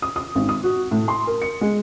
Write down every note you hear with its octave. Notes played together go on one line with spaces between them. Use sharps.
D#6
D#6
G#1
D#6
F#4
A2
C6
A#4
C#7
G#3